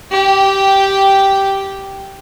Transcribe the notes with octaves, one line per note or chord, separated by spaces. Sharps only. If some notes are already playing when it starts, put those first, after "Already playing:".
G4 G5